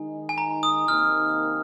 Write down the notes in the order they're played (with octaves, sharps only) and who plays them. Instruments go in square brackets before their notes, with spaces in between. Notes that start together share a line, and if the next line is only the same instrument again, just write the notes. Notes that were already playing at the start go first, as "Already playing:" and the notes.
Already playing: [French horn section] D#3 G#3 D#4 [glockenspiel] G#5
[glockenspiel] G#5
A#5
D#6
[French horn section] C3 D#3 A#3 D#4 [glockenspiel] F6